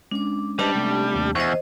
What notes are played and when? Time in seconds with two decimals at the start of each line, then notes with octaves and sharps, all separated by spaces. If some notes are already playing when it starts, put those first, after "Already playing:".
0.11 G#3 C#4 D4 D6
0.59 G3 D4 G4 B4 C5 D#5 A5
0.74 C3 A3
1.15 D#2
1.35 E2 C5 D#5 C#6